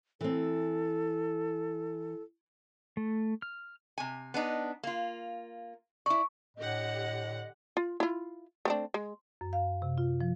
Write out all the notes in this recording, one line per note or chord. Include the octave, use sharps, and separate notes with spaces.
E3 C4 A4
A3
F6
C3 G#5
B3 D4 D#4
A#3 F4
E4 D5 C#6
A2 D3 G4 D#5 F#5
F4
E4 F4
A3 C4 D4
G#3
F#2
F5
C3
F4
F3